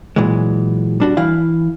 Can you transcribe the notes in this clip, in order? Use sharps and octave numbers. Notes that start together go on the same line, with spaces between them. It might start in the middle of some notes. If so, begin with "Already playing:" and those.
A#2 E3 F#3 G#3
G3 D4 F#4
E3 E4 F5